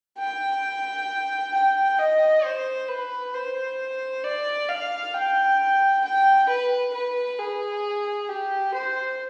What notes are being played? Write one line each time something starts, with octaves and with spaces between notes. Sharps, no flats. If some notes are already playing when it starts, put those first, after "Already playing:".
G5
G5
D#5
C5
B4
C5
D5
F5
G5
G5
B4
B4
G#4
G4
C5